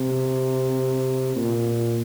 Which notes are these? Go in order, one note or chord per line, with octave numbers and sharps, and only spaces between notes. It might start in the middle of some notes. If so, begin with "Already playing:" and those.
Already playing: C3
A#2